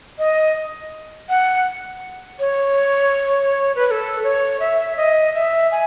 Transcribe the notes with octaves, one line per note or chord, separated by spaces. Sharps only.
D#5
F#5
C#5
B4
B4
A4
C#5
E5
D#5
E5
G#5